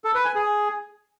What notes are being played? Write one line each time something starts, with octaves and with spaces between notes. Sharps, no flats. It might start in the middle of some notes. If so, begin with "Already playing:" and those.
A4
B4
G#5
G#4